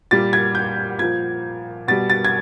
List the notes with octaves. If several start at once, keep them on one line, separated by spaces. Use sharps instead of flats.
A#2 G3 A6
G#6
G6
A#2 F3 G#6
B2 G3 A6
A6
G#6